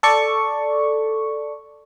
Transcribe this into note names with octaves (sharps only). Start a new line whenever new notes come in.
A4 D5 C#6